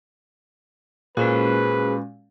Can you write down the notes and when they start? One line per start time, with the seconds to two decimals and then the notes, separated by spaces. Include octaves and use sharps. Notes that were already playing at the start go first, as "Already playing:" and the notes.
1.17 A#2 G#3 C#4 F#4 G#4 B4 C5